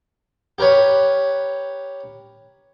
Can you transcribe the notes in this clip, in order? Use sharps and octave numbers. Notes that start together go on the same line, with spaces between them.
G4 A#4 B4 C#5 B5